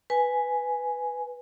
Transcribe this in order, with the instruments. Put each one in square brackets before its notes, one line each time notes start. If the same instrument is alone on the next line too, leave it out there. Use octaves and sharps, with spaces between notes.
[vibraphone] B4 G#5